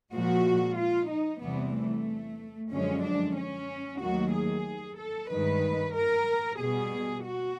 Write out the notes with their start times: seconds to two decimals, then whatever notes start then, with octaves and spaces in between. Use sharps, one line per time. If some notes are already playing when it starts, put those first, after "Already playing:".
0.13 A#2 F3 G#3 F#4
0.77 F4
1.10 D#4
1.42 E2 C3 E3 G3 B3
1.75 A3
2.71 F#2 D3 F3 G#3 C#4
3.04 D4
3.36 C#4
4.01 D#2 D#3 F#3 A3 F#4
4.33 G#4
4.98 A4
5.30 G2 D#3 G#3 B4
5.95 A#4
6.59 B2 G3 G#4
7.24 F#4